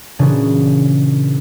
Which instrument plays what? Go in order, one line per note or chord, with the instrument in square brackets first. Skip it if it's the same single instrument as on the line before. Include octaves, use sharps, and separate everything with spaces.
[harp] A#2 C#3 E3 D4 F#4 G#4